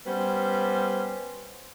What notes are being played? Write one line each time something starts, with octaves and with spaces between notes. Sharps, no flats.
G3 B3 C#4 B4 C5